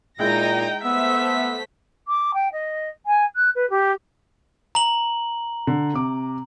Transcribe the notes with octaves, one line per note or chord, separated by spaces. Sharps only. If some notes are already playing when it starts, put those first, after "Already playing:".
A#2 G#3 D#4 E4 G5 A#6
A3 B3 C5 E5 B6
D6
G5
D#5
G#5
F#6
B4
G4
A#5 F#7
D3
C3 D6